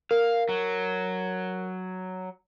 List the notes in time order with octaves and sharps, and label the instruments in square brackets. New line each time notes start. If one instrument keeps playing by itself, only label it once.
[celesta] A#4 [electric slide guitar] F5
[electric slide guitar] F#3